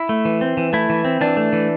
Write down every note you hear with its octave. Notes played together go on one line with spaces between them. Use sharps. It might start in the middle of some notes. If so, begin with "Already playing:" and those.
Already playing: E4
A3
E3
C4
E3
A3 E4
E3
C4
E3 D4
A3
E3